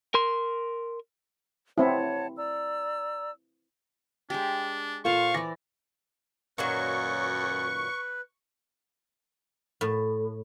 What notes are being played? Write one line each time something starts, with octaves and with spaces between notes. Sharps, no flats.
A#4 C6
C4 E4 C#5 F#5 A5
D5 A#5 E6
G#3 D4 G4
A#2 F4 A4 C5 F5 A5 C#6
E3 D5 D6 A#6
F#2 A#2 D#3 F#3 B4 C#6
A2